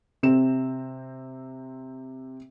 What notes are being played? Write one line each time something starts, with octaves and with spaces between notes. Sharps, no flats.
C3 C4 E7